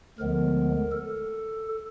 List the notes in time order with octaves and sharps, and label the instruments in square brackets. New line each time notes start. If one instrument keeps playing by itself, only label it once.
[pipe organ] D2 D3 F3 G#3 B3 A#4
A4